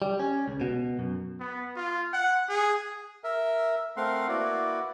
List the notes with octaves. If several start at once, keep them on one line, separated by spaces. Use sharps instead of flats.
G3
C#4
C#2
B2
F#2
B3
F4
F#5
G#4
A#4 E5
A3 C4 A#4 F5 F#5 C6
A#3 E4 F#4 B4 D5 F#5